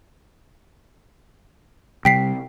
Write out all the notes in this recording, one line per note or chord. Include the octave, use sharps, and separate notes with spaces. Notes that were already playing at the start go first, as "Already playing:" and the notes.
C3 G3 G5 B6 C7